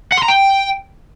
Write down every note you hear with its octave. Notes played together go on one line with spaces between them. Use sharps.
F#5
C6
A#5
G5